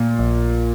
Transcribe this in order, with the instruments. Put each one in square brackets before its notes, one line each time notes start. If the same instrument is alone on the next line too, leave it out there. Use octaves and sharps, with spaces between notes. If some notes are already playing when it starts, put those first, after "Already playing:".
Already playing: [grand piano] A#2
[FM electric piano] A#1